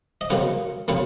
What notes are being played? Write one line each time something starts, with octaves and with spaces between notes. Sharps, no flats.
D#5
C#3 F#3 A#3 F#5
C#3 F#3 A#3 F#5